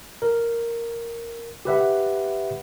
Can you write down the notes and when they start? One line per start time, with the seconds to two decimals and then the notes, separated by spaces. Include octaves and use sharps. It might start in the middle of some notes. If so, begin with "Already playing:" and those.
0.22 A#4
1.65 G4 B4 E5 F#5